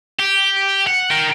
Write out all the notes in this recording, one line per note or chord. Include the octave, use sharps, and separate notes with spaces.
G4
F#5
A#4 G5